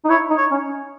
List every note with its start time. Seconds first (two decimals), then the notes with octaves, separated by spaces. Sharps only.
0.05 D#4
0.10 E4 C#5
0.30 D#4
0.37 C#5
0.51 C#4